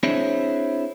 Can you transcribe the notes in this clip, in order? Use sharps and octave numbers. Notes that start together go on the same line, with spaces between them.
C4 D4 E4 G#4 C5 C#5